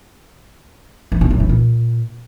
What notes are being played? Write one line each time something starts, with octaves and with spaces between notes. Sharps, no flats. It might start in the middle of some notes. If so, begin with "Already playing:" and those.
E3
B2
F#2
E3
A#2